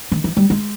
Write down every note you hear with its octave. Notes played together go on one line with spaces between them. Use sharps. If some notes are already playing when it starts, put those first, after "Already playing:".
D#3
E3
G3
G#3